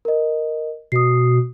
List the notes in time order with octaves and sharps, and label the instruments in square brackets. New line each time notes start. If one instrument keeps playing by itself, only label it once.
[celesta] A#4 D#5
[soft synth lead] B2 [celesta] D#6 C7